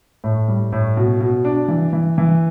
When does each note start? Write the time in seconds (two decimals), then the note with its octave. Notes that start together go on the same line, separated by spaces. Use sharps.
0.24 A2
0.48 G3
0.73 A2
0.97 B2
1.21 B2
1.45 D4
1.68 E3
1.93 E3
2.18 E3